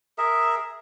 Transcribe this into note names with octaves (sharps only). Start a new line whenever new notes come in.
G#4 A#4 E5